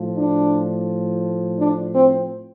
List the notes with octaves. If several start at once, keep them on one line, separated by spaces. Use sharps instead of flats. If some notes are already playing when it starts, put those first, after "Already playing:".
Already playing: A2 F3
D4
D4
C4